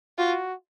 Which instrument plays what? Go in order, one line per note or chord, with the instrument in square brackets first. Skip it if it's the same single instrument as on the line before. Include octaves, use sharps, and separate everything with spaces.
[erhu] F4 [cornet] F#4